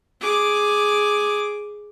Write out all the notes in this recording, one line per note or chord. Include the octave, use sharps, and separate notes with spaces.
G#4 D6